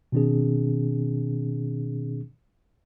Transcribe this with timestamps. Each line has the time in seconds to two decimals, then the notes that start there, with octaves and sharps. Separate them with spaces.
0.12 B2 D#3 C4 D4 G#4